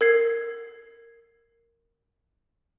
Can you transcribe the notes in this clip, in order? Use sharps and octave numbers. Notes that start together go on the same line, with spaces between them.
A#4 G#6 C7